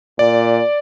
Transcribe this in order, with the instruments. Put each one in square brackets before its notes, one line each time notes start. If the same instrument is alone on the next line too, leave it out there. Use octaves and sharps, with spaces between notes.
[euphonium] A#2 [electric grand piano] D5